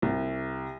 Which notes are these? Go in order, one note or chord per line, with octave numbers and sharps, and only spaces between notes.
C2